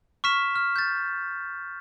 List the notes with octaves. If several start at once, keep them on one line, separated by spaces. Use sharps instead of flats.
C#6 F6 B6 E7
F6
G6 A6